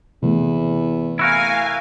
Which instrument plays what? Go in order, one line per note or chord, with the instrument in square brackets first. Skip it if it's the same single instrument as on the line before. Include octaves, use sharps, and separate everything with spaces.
[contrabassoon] E2 [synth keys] C3 E3 A3
[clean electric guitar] E4 F#4 A#4 [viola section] F5 G#5